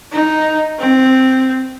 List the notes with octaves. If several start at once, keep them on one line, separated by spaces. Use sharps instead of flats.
D#4
C4